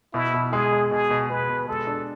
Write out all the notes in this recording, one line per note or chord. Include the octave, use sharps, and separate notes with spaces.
B2 E4
B2
G#3 G#4
G#3
B2 G#4
B2
B2 B4
B2
G#3 A4
D4